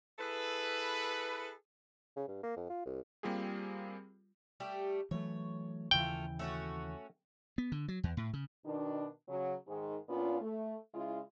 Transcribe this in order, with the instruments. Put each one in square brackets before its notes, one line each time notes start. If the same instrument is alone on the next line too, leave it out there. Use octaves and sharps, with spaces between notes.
[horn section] E4 G#4 A4 B4
[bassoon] C#3
G2
A#3
F2
F4
C2
[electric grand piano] G3 A#3 C4 F4 G4 G#4
[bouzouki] G3 A3 G4
[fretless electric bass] E3 F#3 A3 [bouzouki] C#5
[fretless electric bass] D#2 C#3 E3 [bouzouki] A3 F4 [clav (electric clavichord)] G5
[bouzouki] A3 C#4 F#4
[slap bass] B3
D3
F#3
E2
A2
C#3
[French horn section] B2 D#3 D4
C#3 F#3
G#2 D#3 G#3
A#2 B3 C#4 D4 F4
A3
C#3 G#3 E4 F4